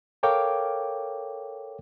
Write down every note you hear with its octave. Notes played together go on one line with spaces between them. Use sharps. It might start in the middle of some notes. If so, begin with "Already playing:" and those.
A4 A#4 C#5 F5 G5 D6